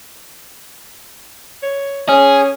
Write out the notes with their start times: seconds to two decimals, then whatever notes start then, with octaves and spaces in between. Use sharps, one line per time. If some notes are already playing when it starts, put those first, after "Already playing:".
1.63 C#5
2.09 C#4 G#4